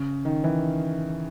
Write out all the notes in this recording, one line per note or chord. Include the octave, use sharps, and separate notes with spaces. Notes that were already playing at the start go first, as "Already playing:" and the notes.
Already playing: C#3
D#3
E3